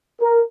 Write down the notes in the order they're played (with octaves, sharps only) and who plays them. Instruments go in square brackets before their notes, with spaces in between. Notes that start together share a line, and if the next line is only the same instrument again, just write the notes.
[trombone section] A#4